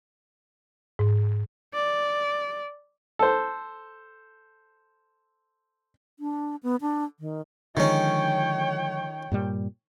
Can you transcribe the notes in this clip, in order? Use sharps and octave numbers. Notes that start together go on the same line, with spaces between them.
G#2
D5
A4 C5
D4
B3
D4
D#3
D3 D#3 F3 G#3 C#4 C#5 G5
G2 A#2 G3